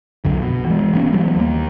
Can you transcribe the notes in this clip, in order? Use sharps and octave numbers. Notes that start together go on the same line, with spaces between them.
C2 F#2 D3
B2
E3 G#3
E3 G#3 B3 C#4
E3 F#3 G3
D#2 A#3